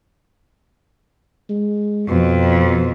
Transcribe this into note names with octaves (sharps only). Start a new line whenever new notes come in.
G#3
F2 B2